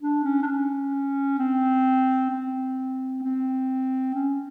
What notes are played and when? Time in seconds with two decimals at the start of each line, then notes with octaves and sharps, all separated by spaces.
0.01 D4
0.24 C#4
0.43 D4
0.46 C#4
1.39 C4
2.31 C4
3.22 C4
4.15 C#4